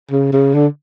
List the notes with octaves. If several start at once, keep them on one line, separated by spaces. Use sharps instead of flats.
C#3
C#3
D3